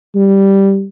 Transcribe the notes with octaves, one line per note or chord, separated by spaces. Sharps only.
G3